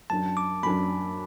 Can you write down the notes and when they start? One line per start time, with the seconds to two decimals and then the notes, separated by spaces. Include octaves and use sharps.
0.10 F#2 F#3 D4 A5
0.37 D6
0.63 F#2 F#3 D4 B5